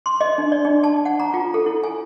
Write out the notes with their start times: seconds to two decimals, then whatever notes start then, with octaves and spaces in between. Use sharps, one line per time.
0.06 C6
0.21 D#5
0.38 D4
0.52 D5
0.65 D4
0.83 A5
1.05 F#5
1.20 A#5
1.34 F4
1.54 A4
1.66 E4
1.83 G#5